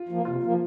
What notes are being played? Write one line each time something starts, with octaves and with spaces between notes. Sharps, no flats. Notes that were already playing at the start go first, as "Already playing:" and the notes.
Already playing: F4
F3 A#3
C3 F4
F3 A#3